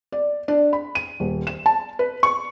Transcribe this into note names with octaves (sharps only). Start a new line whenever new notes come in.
D5
D4
B5
D#7
D#1
E7
A5
B4
C#6